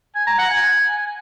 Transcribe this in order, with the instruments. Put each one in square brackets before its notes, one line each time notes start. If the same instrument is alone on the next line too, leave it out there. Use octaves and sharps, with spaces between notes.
[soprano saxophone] G#5
A#5
F#5
G#5